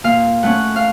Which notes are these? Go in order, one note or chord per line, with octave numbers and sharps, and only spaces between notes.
A#2 F5
A3 C#4 F#5
F5